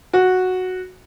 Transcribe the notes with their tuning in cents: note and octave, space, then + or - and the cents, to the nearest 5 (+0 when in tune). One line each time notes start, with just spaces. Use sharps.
F#4 -5